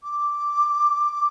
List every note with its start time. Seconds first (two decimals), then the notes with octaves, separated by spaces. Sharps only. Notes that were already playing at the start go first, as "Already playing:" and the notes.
0.03 D6